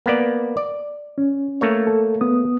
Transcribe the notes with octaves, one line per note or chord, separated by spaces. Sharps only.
A#3 B3 D5
D5
C#4
A3 A#3 C#5
A4
B3 D#6